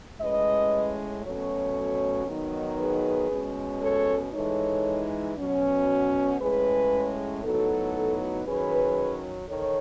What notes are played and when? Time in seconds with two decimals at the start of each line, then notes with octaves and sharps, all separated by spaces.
0.20 A2 G#3 C#4 B4 D#5
1.23 B2 F#3 A3 C#4 A4 C#5
2.26 D#3 F#3 B3 D#4
2.78 G#4 B4
3.30 B2 G#3 C#4
3.82 A4 C#5
4.33 E3 G#3 D#4 A4 C#5
5.37 B2 F#3 C#4
6.39 A2 G#3 C#4 G#4 B4
7.43 A2 F#3 B3 D#4 F#4 A4
8.46 D#3 F#3 C#4 G#4 B4
9.49 D#3 A4 C#5